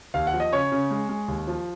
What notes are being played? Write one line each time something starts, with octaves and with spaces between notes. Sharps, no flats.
D#2 F5
F#5
F3
D#5
C#3 C#5
C#3
G#3
G#3
D#2
F3